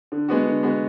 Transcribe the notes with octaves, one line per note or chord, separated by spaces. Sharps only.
D3
G#3 B3 F#4
D3
G#3 B3 F#4